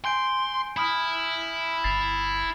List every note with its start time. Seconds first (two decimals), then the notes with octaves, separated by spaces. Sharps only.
0.05 G#5 C6 G6 D7
0.77 E4 B5 D#6 F6
1.84 G1 A6 C7 F7